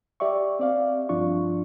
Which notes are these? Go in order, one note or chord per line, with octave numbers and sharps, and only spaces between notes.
G4 D5 E5 C#6
C4 D5 F5
G2 F3 D4 F4 C#6